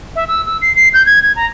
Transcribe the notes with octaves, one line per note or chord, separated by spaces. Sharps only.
E5
E6
E6
C7
C7
G6
G#6
G#6
A#5